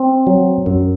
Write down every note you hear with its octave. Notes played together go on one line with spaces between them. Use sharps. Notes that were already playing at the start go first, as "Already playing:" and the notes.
Already playing: C4
F#3
F#2